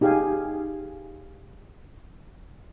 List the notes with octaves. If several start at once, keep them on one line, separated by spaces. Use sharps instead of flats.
D#4 G4 G#4 F5 G5 G#5